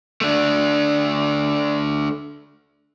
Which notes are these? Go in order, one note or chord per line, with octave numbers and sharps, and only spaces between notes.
A3 D4